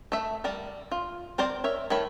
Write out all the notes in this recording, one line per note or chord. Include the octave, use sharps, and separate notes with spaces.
A3 E5
G3 A#4 D5
F4
C4 A#4 C5 D5
A#4 C#5 E5
D#3 A3 C#5 B5